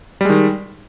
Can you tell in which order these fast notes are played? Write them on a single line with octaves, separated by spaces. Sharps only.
G3 G#3 D#3